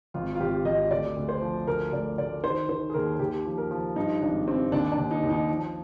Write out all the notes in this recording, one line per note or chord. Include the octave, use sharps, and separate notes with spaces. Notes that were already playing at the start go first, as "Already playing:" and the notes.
G#1 F4
F4
G#1 G4
G#1 D#5
D2 D5
D2
C5
F3
D2 A#4
D2 D5
D2 D5
D#3 C5
D#3 C5
G#4
D#2 A#4
D#2 G4
F3
A#4
F3
G2 D#4
G#1 D4
G2 C4
D#2 D4
D4
D#2
D#4
D#2
D#4
F3